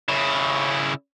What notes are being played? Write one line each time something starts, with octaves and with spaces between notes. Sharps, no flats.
C#3 E4